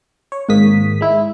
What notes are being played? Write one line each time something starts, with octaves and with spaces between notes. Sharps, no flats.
C#5
G#1 G#2 A#3 D#6 B6
G#3 E4